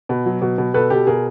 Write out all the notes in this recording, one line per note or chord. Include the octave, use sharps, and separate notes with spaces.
B2
F#3
B2
B2
B2 A4 B4
B2 G4 A4
B2 G#4 A#4